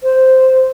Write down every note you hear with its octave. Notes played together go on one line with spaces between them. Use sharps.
C5